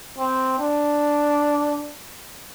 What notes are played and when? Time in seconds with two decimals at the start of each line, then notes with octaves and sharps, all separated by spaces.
0.18 C4
0.59 D4